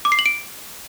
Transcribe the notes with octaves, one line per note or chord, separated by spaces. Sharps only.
D6
C7
F#7
D7